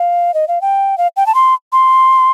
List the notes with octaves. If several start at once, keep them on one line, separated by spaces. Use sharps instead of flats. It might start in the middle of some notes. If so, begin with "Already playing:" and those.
Already playing: F5
D#5
F5
G5
F5
G5
A5
C6
C6